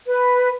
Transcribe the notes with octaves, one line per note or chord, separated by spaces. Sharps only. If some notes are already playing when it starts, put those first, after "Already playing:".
B4